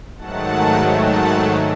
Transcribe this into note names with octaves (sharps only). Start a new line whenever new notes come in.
G#2 D#3 F#3 A3 F#5 A5
F#5 A5